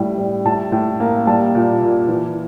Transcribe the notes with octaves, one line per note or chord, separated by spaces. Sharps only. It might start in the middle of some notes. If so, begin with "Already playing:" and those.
Already playing: A2 G3
G3
A2 A5
A2
A#3
G3 A5
A#2
A#2
E3